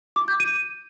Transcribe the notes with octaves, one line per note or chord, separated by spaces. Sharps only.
D6
G6
D#7